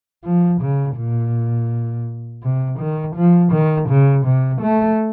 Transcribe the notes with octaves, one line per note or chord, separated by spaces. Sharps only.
F3
C#3
A#2
C3
D#3
F3
D#3
C#3
C3
A3